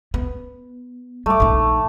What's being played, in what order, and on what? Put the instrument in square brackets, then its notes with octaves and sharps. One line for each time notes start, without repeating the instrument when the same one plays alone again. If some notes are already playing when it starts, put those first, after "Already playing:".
[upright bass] B3
[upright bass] G3 [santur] A3 D6
[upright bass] A#1 D#4